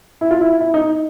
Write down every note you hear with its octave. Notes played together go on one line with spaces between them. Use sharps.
E4
F4
E4
E4
D#4